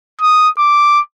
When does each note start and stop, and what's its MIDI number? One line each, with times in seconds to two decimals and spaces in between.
0.21 0.49 87
0.58 0.99 86